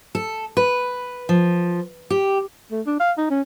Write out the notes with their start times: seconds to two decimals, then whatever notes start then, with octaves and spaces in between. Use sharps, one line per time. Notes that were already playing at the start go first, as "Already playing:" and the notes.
0.15 A4
0.57 B4
1.29 F3
2.10 G4
2.71 A3
2.87 D4
3.00 F5
3.18 D#4
3.30 C#4